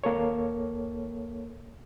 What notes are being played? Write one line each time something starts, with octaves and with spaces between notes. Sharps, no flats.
D#2 A#3 A4 C#5